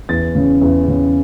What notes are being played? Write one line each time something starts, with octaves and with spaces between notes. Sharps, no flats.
E2 A6
C#3
E2
C#3